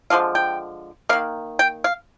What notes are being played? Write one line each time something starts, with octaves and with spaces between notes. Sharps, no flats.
D3 F3 G#3 F5
G5
D#3 A#3 F5
G5
F5